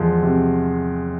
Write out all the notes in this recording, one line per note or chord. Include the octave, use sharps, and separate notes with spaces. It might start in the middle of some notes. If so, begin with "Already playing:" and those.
Already playing: E2 F3 G#3
C3